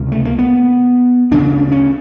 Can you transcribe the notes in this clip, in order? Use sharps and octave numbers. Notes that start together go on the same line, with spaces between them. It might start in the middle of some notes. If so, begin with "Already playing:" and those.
Already playing: C#2 C3
A3
A#3
B3
D2 C#3 D4
C#4